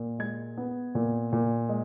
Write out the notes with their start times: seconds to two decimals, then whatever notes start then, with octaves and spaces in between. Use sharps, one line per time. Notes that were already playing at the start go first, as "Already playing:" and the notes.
Already playing: A#2
0.19 G#3 G#6
0.57 B3
0.95 A#2
1.33 A#2
1.69 G#3